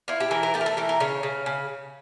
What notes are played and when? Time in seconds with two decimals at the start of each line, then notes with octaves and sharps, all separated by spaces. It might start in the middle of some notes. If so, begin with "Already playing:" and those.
0.08 E4 F4
0.20 G4
0.31 E3 A#4
0.43 A#4
0.54 A3 G4
0.61 A#4
0.66 A4
0.77 E3 A#4
0.89 A#4
1.00 C#3 C#5
1.23 C#3
1.46 C#3